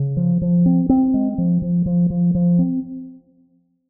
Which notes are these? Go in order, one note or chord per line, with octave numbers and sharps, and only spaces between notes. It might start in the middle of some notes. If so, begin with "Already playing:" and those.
Already playing: C#3
F3
F3
C4
C4
G#3
F3
F3
F3
F3
F3
C4